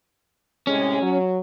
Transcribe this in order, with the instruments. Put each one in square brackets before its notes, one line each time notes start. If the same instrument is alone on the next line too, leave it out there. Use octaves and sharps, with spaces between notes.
[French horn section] A2 C3 G#3 [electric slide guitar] C#4
[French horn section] F#3